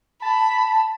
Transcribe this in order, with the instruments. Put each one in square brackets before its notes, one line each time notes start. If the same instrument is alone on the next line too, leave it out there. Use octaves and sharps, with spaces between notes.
[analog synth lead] A5 [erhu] B5